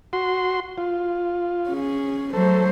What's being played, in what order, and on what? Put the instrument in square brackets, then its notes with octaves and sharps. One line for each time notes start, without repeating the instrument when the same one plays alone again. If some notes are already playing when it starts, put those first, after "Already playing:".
[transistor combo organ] F#4 C6
F4
[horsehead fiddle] C#4 G#4
[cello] F#3 [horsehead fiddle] A3 C5 [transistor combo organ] A4